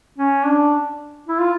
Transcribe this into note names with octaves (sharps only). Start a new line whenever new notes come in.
C#4
D4
E4
F4